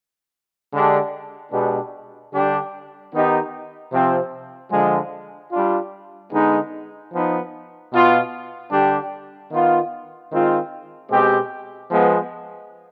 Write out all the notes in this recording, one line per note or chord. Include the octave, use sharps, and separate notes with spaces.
D3 G#3 D4 G4
B2 G#3 B3 D4 G4
D3 G3 D4 G4
D#3 B3 D#4 G4
C3 F3 C4
D3 F3 G#3
G3 D4 F4
D3 G#3 B3 D#4
F3 B3 D#4
B2 B3 F4
D3 G3 D4 G4
D#3 B3 F4
D#3 G#3 C4 F4
B2 G#3 C4 G4
F3 G#3 B3